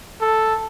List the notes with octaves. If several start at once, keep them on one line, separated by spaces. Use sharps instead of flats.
A4